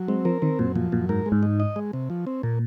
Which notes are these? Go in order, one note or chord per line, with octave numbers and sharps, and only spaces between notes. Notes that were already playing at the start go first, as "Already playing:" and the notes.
Already playing: F#3
G#3 C4
F3 A#4
D#3 C4
F#2 A#2
A#2 F3
F#2 A#2
G#2 A#4
G#3
G#2
D#4
D#5
G#3
C3
F3
C4
A#2 A#3